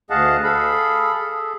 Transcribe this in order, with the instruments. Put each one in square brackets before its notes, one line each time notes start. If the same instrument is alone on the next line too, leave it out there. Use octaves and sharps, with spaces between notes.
[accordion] D2 G#4 D#5 F5 F#5 A5
G#4 A4 F5 B5
G#4 A4